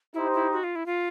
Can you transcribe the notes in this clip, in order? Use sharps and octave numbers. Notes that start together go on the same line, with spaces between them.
D#4 E4 G4 C5
E4
F#4
F4
E4
F4